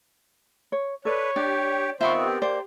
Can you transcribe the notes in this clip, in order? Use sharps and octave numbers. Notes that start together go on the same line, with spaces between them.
C#5
A4 B4 C#5 D5
D4 G4 D5
D#3 B3 C4 F4 C5 E5 B5 C#6
G4
A#3 C5 D5 G5